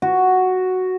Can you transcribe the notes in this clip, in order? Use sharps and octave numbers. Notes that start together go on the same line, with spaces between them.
F#4